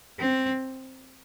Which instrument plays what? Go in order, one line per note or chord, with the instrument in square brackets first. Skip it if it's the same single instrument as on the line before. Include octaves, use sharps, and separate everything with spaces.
[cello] C4